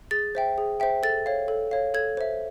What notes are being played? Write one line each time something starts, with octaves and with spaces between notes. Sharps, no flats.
G#4 A6
C5 E5 G5
G#4
C5 E5 G5
A4 A6
C#5 F5
A4
C#5 F5
A4 G#6
C5 E5